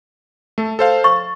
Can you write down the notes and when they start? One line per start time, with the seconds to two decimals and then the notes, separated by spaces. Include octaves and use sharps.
0.58 A3 A4
0.79 A4 C5 F5
1.04 C#6 A6